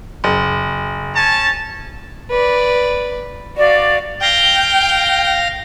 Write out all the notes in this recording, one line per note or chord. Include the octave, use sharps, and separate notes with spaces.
F#1
C#4 A5
B4 D5
F#4 D5 F5
F5 G5 A#6